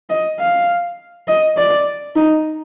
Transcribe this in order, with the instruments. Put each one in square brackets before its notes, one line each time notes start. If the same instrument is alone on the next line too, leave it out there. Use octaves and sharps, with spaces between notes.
[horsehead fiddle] D#5
F5
D#5
D5
D#4